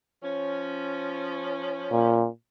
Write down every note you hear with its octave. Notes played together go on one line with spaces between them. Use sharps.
F3 C#4
A#2